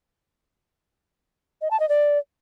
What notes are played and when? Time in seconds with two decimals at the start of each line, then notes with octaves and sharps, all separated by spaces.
1.62 D#5
1.71 A5
1.80 D#5
1.89 D5